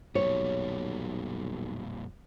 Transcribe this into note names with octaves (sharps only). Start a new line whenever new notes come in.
B1 F2 A#2 G3 C#5